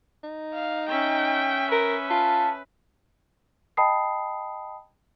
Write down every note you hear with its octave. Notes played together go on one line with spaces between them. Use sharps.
D#4
F5
C#4 E5 G5
A#4 B4
F4 A5
D#5 G5 A5 B5 D#6 C7